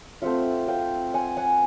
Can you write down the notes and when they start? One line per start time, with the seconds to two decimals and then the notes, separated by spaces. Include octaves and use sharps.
0.22 A3 C4 F4 E5 F#5
0.68 F5 G5
1.14 F#5 G#5
1.37 F#5 G#5